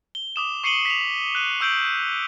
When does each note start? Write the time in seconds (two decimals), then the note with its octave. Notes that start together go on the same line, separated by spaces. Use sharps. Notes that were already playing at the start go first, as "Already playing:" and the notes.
0.15 G7
0.36 D6 D#6 E7
0.64 C#6 C7 C#7 D#7 F#7 G7
0.85 B6 F7
1.35 F#6 D#7
1.61 C#6 E6 G6 D7 F#7